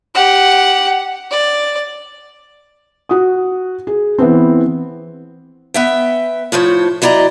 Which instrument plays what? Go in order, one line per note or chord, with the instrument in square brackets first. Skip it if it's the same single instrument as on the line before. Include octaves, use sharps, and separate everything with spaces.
[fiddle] G4 F#5
D5
[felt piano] F#4 D#6
G#4
E3 B3 C4
[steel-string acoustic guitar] B3 E5 G5
A2 F3 C5 C#5
F#3 E4 D5 D#5 A#5